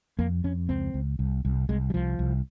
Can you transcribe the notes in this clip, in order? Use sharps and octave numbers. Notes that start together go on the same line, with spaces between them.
F2 A#3
F2 C#4
C#2 C4
C#2
C2
C2
C2 G#3
G3
C2 F3
C2